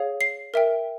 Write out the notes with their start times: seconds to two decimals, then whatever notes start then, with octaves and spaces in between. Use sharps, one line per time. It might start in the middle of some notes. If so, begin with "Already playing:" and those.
Already playing: G#4 C#5 F5
0.21 C7
0.54 A#4 E5 G5